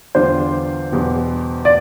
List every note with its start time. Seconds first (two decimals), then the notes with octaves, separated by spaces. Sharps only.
0.15 E2 D3 G3 D4 F4 C5
0.92 E2 B2 G3
1.65 D5